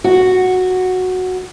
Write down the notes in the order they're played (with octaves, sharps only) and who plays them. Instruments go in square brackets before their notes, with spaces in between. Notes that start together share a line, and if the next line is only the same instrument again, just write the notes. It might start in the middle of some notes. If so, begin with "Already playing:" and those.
[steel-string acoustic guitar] F#4